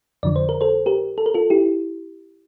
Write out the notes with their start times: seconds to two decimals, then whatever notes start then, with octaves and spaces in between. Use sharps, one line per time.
0.23 F2 D3 F3 D5
0.36 C5
0.49 A#4
0.61 A4 C5
0.86 G4 A#4
1.18 A4
1.26 A#4
1.34 F4 A4
1.50 E4 G4